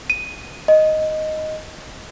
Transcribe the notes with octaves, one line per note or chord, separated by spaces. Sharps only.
D#7
D#5